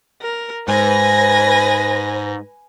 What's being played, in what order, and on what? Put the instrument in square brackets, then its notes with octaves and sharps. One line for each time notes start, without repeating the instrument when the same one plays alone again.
[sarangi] A#4
[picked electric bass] G#2 [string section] B4 A#6 [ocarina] C5 [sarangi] G#5